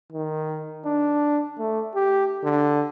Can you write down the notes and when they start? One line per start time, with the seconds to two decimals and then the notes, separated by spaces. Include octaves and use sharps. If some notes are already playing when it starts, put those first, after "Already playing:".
0.12 D#3
0.85 D4
1.59 A3
1.95 G4
2.44 D3